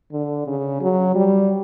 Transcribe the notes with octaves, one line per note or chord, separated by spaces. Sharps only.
D3
C#3
F#3
G3